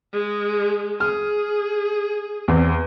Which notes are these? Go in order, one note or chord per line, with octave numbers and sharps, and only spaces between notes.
G#3
G#4 F6
E2 C4